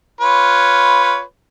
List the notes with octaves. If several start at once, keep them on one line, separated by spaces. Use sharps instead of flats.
F4 B4 C#5